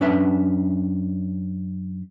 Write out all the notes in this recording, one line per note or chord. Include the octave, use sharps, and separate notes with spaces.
F#2 C#4 D4 B4 E5